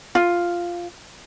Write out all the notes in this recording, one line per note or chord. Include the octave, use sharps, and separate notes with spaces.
F4